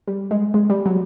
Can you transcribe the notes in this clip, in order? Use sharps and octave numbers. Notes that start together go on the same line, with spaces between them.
G3
G#3
G#3
G3
F#3